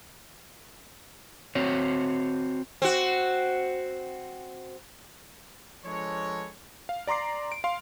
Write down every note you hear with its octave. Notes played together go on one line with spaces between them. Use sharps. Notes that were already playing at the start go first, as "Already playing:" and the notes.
C4 F#4 C#5
C4 F#4
F3 G#3 D4 A4 B4 C#5
F5
D5 A#5 C6 D6 C7
D7
F5 C6